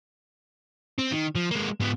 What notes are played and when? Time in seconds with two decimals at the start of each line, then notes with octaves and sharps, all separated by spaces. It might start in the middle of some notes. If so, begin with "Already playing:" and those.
0.98 C4
1.12 D#3
1.35 F3
1.51 G#3 A#3
1.80 G#2 B3